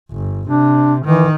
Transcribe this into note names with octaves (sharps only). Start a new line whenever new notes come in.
G1
C3 D4
D#3 E3